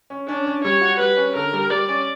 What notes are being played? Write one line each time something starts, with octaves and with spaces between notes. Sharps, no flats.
C#4
C#4 D4
C#4
G3 C#5
F#4
G3 B4
C#4
D3 A#4
G3
G3 D5
C#4